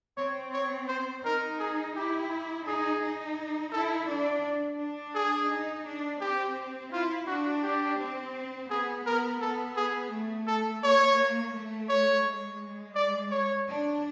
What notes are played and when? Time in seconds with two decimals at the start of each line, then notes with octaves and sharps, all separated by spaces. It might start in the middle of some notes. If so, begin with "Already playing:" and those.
0.17 C4 C#5
0.54 C#5
0.89 C5
1.24 D#4 A#4
1.59 G#4
1.96 E4 G4
2.66 D#4 G#4
3.02 D#4
3.72 E4 A4
4.08 D4
4.80 D4
5.15 G#4
5.51 D#4
5.86 D4
6.21 C4 G4
6.92 E4 F4
7.27 D4 F#4
7.63 G4
7.99 C4
8.69 B3 G#4
9.06 B3 A#4
9.41 B3 A4
9.77 G#4
10.12 A3
10.47 A4
10.83 A#3 C#5
11.54 A3
11.89 C#5
12.25 G#3
12.95 D5
13.32 C#5
13.67 D4